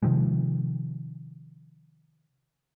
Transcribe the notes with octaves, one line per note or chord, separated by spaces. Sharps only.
C3 D#3 F3 G#3